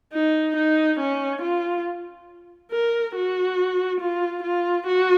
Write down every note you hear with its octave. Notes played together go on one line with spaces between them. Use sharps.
D#4
D#4
C#4
F4
A#4
F#4
F4
F4
F#4